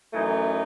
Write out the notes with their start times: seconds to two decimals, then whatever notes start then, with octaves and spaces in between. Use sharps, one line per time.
0.13 F#2 E3 A3 D#4